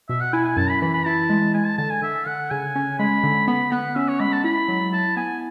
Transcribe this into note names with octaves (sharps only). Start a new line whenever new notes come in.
B2 E5
F#5
E4 G#5
G#5
F#2 A5
B5
E3 B5
B5
E4 A5
G#3
G#3 G#5
A5
D3 A5
G#5
D3 E5
D3 F#5
C#3 G#5
C#4
G#3 B5
D3
B3 B5
B3 F#5
C#4 E5
C#5
G#3 B5
A5
E4 B5
F#3
E4 A5
B3 G#5